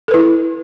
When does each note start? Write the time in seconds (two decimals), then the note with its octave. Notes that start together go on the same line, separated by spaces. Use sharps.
0.08 A4
0.11 B4
0.14 E4